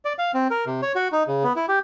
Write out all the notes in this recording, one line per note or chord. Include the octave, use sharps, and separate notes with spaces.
D5
F5
C4
A#4
C3
C#5
F#4
D#4
C#3
B3
E4
G4